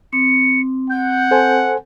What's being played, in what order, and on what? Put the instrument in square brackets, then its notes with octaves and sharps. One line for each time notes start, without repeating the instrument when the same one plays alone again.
[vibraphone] C4 [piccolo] C#7
[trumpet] F#5 [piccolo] G6
[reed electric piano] A4 C5 G#5